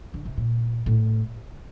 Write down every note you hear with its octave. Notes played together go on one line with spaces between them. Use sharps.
D3
C3
A#2
A2